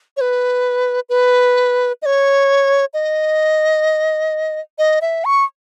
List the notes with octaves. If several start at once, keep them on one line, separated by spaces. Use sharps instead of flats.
C#5
B4
B4
D#5
C#5
D#5
D#5
E5
C#6